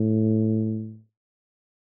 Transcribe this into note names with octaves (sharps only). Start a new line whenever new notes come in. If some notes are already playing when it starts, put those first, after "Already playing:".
Already playing: A2